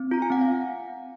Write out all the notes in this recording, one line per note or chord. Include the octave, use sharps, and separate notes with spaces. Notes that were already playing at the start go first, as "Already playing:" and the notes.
Already playing: C4
F4 A#5
G#5
C4 F#5
F5